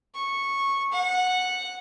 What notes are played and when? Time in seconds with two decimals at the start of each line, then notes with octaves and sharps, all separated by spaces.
0.14 C#6
0.93 F#5